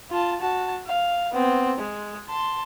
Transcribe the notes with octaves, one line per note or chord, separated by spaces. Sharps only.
F4 A5
F#4 A5
F5
B3 C4
G#3
A5 C6